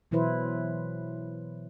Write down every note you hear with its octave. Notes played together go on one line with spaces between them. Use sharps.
B2 E3 F#3 E4 B4 C5